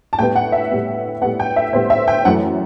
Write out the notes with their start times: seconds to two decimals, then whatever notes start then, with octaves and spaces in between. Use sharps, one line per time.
0.13 A5
0.19 A2 G3 B3 G5
0.36 F#5
0.52 E5
0.70 A2 G3 B3
1.21 A2 G3 B3 F#5
1.40 G5
1.56 E5
1.73 A2 G3 B3 C5
1.90 E5
2.08 G5
2.25 F#2 E3 A3 F#5